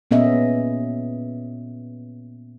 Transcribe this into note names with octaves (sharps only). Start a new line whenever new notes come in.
A#2 B3 C#4 D#5 E5